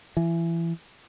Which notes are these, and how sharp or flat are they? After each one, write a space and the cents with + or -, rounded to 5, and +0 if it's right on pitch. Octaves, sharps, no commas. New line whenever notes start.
E3 +25